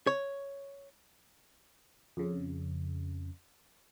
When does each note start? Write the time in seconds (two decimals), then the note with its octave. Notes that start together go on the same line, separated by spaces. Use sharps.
0.07 C#5
2.17 F2 C#3